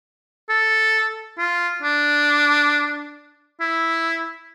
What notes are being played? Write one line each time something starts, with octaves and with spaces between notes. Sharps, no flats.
A4
F4
D4
E4